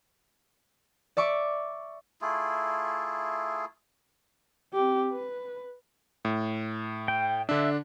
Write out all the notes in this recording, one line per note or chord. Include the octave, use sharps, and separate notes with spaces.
D5 E5 C#6 D6
A3 E4 F4 G#4
C4 G4
B4
A2
G5
D3 D4 E5